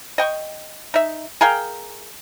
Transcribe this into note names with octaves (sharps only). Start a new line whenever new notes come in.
D#5 G5 C#6
D#4 E5
G#4 A#4 F5 G5